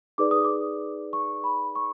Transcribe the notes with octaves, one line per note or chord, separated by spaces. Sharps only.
D#4 G#4 B4 D5 D6
D#6
D6
C#6
B5
C#6